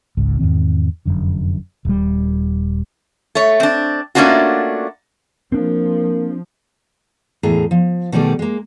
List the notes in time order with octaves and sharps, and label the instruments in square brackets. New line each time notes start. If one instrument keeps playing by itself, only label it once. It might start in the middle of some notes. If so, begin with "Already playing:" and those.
[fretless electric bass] G#1 C#2 G#2
E2 G#2 D#3 C4
F1 B1 F#2 D3
D#1 G3
[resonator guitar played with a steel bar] A3 C#5
C4 D4
A3 A#3 C#4 D4 F4 F#4
[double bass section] F3 [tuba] A#3 [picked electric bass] C4 D4
[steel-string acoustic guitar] E2 A2 G#4 A#5
F3
B2 D#3 G3 A3 G#4 D5
G#3 A#3